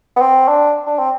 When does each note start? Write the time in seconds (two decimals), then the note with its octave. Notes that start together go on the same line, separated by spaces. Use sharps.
0.16 B3
0.21 C4
0.48 D4
0.87 D4
0.99 C4